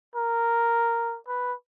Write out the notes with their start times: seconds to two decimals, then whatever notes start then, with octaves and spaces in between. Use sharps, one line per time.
0.16 A#4
1.28 B4